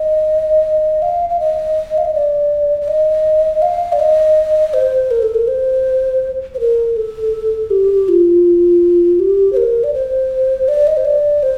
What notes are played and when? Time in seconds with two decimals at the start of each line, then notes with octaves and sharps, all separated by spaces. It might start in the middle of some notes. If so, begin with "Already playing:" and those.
Already playing: D#5
1.02 F5
1.29 F5
1.40 D#5
1.98 F5
2.05 D#5
2.14 D5
2.81 D5
2.88 D#5
3.62 F5
3.92 D5
3.99 D#5
4.73 C5
5.11 A#4
5.22 A4
5.34 A#4
5.48 C5
6.54 C5
6.60 A#4
6.96 A4
7.70 G4
8.08 F4
9.19 G4
9.52 C5
9.57 A#4
9.84 D5
9.94 C5
10.68 D5
10.87 D#5
10.97 C5
11.05 D5
11.43 C5